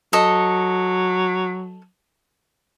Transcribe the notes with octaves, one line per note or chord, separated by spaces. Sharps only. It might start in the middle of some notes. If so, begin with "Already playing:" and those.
F#3 A4 D#5